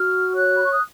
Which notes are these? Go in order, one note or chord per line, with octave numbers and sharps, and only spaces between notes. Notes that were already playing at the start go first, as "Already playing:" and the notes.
Already playing: F#4 F6
C#5 F#6
B5
C#6
D#6